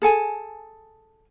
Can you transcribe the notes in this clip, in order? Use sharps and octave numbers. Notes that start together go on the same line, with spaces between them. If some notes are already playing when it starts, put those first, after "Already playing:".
G#4 A4 G#5